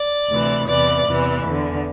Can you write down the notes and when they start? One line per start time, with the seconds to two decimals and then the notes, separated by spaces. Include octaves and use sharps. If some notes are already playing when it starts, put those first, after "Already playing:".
Already playing: D5
0.29 D2 C3 E3
0.67 E2 C3 E3 D5
1.05 E2 C3 E3
1.45 E2 D3